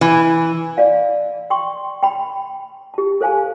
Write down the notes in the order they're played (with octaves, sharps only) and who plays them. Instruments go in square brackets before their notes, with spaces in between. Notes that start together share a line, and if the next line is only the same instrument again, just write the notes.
[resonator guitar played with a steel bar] E3
[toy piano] D5 F5 F#5
G5 C6 C#6
G5 B5
G4 A5
A4 C5 F5 G#5 A5